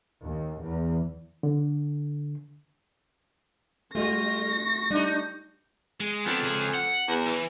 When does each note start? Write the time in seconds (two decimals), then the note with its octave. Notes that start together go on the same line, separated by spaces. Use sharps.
0.24 D#2
0.64 E2
1.43 D3
3.95 G3 A3 F4 F#4 C#6 A#6
4.91 G3 D4 D#4
6.00 G#3 G#4
6.25 F2 B3 D4
6.42 C#2 G#4
6.74 F#5
7.08 E2
7.26 E3